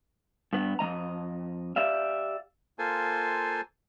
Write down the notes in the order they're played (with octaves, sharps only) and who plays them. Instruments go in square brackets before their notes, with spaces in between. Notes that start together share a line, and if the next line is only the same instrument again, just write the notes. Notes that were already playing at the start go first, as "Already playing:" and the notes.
[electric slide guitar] G2 B3
F2 G3 D#5 A#5
G4 D5 E5 F5
[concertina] A#3 F4 A4 C5 G#5